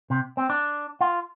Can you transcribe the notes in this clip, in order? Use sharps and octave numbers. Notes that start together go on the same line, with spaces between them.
C3
C4
D4
F4